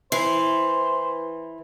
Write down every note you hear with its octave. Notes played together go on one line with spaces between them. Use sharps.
E3 C5